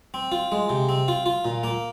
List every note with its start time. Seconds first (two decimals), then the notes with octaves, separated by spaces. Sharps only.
0.14 C4
0.32 F4
0.52 G#3
0.69 C3
0.89 C4
1.08 F4
1.26 F4
1.45 A#2
1.64 A#3